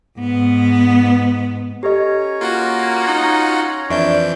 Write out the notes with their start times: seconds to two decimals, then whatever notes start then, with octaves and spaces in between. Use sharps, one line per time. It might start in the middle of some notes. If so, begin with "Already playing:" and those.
0.19 G#2 B3
1.83 C#4 G4 A4 C#5 D#5 A#5
2.41 A#3 F4 F#4 F#5
3.08 D#4
3.90 F2 E3 D4 D5 E5 C#6 G6